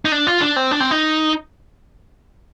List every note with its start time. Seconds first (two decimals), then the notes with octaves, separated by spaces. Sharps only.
0.05 D#4
0.12 D4
0.27 F4
0.41 D4
0.56 C4
0.71 D4
0.80 C4
0.91 D#4